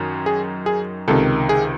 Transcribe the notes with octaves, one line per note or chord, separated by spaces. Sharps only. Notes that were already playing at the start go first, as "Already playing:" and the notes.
Already playing: F#2 D#3
G#4
G#4
C#2 C3 D#3 A4
G#4